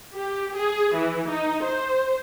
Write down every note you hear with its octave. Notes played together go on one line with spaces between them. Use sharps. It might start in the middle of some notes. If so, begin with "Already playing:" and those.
G4
G#4
E3
D#4
C5